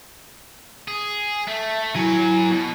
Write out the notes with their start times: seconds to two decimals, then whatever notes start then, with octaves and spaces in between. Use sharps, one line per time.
0.88 G#4
1.48 A3 E5
1.96 F#3 E4 A#4 G#5
2.51 B2